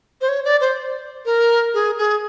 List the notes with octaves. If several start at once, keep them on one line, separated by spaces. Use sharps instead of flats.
C5
C#5
D5
C5
A#4
G#4
G#4